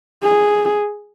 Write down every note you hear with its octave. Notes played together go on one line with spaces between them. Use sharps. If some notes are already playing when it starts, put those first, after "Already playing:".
G#4